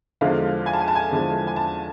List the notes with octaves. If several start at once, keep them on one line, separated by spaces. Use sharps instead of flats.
E2 D3 F3 G#3 F5
G#5
A5
G#5
A5
G#5
E2 D3 F3 G#3
G#5
A5